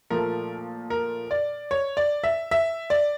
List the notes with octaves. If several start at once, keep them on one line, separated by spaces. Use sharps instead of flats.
A#2 F3 A3 A#4
A#4
D5
C#5
D5
E5
E5
D5